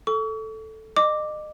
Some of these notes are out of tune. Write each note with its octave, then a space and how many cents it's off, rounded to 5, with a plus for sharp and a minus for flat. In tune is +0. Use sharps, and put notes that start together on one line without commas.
A4 +0 C#6 +40
D#5 -35 D6 +0